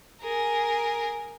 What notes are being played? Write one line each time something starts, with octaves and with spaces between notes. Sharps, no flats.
G#4 A#4